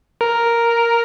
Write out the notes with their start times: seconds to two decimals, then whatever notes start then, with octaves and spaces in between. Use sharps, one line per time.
0.21 A#4